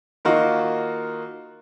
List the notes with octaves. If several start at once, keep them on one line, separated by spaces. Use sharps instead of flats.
D#3 A#3 D#4 F4 F#4